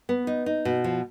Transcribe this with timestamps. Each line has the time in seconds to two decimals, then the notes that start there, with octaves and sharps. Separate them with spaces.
0.09 B3
0.27 D#4
0.46 D#4
0.65 B2
0.84 F3